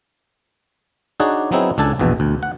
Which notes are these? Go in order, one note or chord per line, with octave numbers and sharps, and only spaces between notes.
D4 D#4 F#4 G#4 C#5 D5
F#3 B3 C4 D#4 E4 G#4
C#2 D4 A4 G#5 A5
A#1 E2 B2
D2
F#5